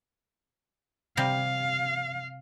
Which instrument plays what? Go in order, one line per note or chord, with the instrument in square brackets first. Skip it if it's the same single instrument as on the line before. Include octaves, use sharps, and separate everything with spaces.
[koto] C3 G3 [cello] F5